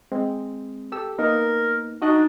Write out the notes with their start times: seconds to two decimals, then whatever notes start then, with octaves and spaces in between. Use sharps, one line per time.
0.12 G#3 C4
0.92 G4 A4 E6
1.18 A#3 B3 D#4 A#4
2.02 D4 D#4 F#4 D#5 F#6